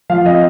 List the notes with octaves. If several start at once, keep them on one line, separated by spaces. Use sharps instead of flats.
F3 F5
C4 D#5